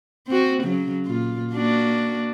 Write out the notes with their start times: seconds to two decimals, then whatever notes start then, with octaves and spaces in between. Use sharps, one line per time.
0.27 C4 F#4
0.62 C#3 F#3
1.06 A#2 F4
1.53 A#3 D4 F#4